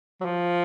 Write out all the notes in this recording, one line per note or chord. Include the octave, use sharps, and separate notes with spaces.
F#3
F3